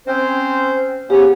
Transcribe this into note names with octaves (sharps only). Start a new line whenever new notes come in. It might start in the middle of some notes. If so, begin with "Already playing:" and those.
C4 C#4 C5
C#3 B3 C#4 G4